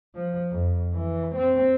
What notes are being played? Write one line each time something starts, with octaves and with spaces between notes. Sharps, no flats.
F3
F2
E3
C4